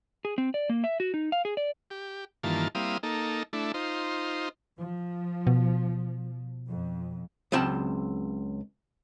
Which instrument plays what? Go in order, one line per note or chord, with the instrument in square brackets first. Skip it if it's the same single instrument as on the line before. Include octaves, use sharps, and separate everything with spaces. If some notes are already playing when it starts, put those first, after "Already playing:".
[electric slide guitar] G#4
C4
D5
A#3
E5
F#4
D#4
F5
G#4
D5
[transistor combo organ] G4
G2 D#3 E3 A#3 F4 A5
G3 A#3 C4 E4 F5 D#6
A#3 D#4 A4
A3 D4 E4
D#4 F4 C5
[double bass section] F3
[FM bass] B2
[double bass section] F2
[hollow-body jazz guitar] C#2 F#3 C4 G5 A5